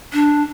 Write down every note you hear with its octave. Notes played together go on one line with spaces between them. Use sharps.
D4